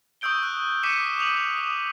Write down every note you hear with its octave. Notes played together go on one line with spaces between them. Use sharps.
C#6 D#6 E6 G6 D7 G7
F#6
D6 B6 C#7 D#7 E7
D#6 D#7 F7 F#7
D#6